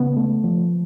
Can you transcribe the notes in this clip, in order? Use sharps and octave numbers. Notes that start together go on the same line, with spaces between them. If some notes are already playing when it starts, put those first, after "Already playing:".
Already playing: C#3 B3
A3
F3